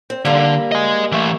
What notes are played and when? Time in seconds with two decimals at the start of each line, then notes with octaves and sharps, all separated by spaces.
0.10 C4
0.25 D3 G3 A#3
0.72 D#5 G#5
1.12 E3 A3